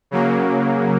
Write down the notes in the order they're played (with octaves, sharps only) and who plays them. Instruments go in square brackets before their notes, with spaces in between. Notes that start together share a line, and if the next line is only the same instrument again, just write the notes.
[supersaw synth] C#3 F#3 A#3